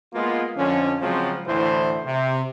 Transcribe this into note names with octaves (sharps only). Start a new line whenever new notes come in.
G#3 A#3 B3 F4
F2 D3 F3 C#4
C#3 F3 F#3 G#3 C4
D2 A2 E3 E4 C5
C3